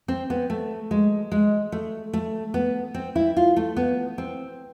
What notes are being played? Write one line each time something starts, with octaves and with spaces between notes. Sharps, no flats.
C4
B3
A3
G#3
G#3
A3
A3
B3
C4
E4
F4
A3
B3
C4